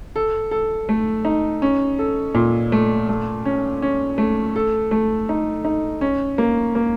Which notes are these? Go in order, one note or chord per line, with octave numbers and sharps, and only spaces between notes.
A4
A4
A3
D#4
C#4
A4
A#2
A3
A3
C#4
C#4
A3
A4
A3
D#4
D#4
C#4
A#3
A#3